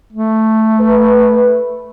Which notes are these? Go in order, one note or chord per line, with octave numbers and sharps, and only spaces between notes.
A3
B4